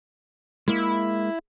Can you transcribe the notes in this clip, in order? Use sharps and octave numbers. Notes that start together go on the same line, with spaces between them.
G#3 A#3 E4